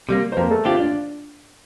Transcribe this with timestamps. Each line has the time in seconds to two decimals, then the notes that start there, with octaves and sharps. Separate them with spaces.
0.09 C3 G3 A#3
0.32 C5
0.37 F2 A#3 A#4
0.51 A3 A4
0.65 D3 A3 C4 F4 G4
0.79 D4 D5